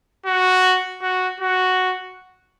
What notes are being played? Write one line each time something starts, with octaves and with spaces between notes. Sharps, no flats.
F#4
F#4
F#4